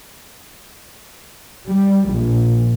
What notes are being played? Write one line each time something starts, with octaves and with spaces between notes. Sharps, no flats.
G3
A#1